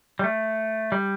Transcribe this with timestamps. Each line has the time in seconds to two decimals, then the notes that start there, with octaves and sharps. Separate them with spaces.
0.19 G3
0.24 A3
0.92 G3